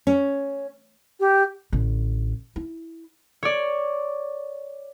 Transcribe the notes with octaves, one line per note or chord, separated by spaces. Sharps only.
C#4
G4
A1 D3
E4
C#5 D5